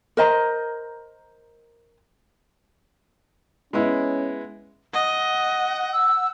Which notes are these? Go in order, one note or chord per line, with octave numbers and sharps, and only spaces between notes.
A#4 C5 D#5 A#5
G#3 B3 C#4 E4
D#5 F#5
E6